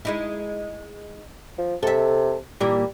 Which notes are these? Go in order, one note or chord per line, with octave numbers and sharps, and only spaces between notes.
G#3 D#4 E4
F3
C3 A4 E5
A#2 E3 G3 A#3